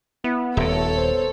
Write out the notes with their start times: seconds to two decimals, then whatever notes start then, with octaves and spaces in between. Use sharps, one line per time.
0.24 B3 E4
0.57 D#1 A#2 A3 A4 C#5
0.97 C5